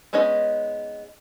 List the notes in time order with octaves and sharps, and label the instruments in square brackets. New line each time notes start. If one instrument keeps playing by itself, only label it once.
[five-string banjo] G#3 B3 C#4 D#4 D#5